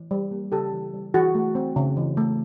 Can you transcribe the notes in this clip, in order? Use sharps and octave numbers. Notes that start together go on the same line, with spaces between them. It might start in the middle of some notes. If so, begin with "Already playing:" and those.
Already playing: E3
G3
A#3
C#3 G4 A4
E3
G3
E3 F#4 G#4
A3
C4
C#3
E3
A3